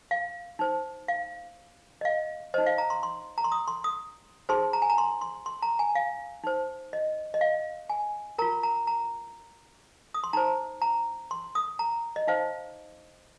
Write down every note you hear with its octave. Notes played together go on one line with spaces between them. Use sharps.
F5
D#4 C5
F5
D#5
F5
D#4 C5 D#5
F5
A#5
C6
C6
A#5
C6
D#6
C6
D#6
D#4 G#4 C5 C6
A#5
G#5
A#5
C6
C6
C6
A#5
G#5
F5
D#4 C5
D#5
D#5
F5
G#5
F4 A#4 A#5
A#5
A#5
D#6
C6
D#4 C5 A#5
A#5
C6
D#6
A#5
D#5
D#4 C5 F5